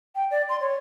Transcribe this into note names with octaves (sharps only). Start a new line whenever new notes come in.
G5
D5
C6
C#5